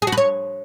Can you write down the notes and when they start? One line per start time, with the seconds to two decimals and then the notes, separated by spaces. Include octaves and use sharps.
0.02 G#4
0.07 F#4
0.12 B4
0.18 C#5